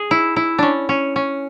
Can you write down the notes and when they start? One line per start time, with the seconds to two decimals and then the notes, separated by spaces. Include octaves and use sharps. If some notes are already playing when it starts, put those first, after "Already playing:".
Already playing: G#4
0.11 E4
0.36 E4
0.58 C#4 D4
0.89 C#4
1.16 C#4